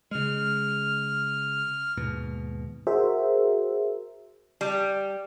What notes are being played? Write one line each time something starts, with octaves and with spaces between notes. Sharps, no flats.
C#3 G#3 F6
D#2 G#2 B2
F#4 G#4 A#4 C5 E5
G3